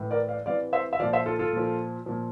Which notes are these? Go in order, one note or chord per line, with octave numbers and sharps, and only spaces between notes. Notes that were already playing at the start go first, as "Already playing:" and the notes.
Already playing: A2 E3
A#4 D5
D5 F5
C3 E3 D5 F5
C5 E5
E5
A#2 F3 D5 F5
C5 E5
F4 A4
F4 A4
A#2 F3
A#2 F3